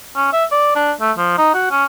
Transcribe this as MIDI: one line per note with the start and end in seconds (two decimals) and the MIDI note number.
0.16 0.30 61
0.33 0.45 76
0.52 0.74 74
0.75 0.92 62
1.01 1.12 57
1.18 1.35 53
1.38 1.53 63
1.54 1.66 66
1.71 1.85 61